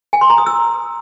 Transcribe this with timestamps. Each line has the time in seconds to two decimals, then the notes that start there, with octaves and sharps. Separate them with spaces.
0.13 G#5
0.21 C6
0.30 A#5
0.38 D#6
0.46 E6